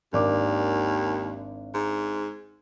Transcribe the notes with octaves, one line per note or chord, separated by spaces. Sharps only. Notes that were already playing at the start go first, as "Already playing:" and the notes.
G#1 D#2 D4 D6
G#2